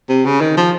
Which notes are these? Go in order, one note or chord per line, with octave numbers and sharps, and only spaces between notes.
C3
C#3
D#3
F3